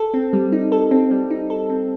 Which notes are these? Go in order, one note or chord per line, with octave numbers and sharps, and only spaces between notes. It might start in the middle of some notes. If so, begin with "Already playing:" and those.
Already playing: A4
C4
G3
D#4
A4
C4
G3
D#4
A4
C4